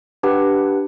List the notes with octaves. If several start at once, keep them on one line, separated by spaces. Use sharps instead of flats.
D4 G4 B4 F#5